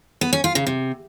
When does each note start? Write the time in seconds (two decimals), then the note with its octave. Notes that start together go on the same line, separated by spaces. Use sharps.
0.21 B3
0.33 C#4
0.44 F4
0.55 C#3
0.67 C3